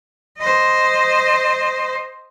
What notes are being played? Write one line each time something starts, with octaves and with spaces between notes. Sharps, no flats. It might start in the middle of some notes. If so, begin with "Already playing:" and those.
C5 D#5